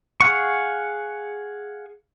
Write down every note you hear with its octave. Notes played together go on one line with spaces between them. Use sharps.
G#4 F5 F#5 C#6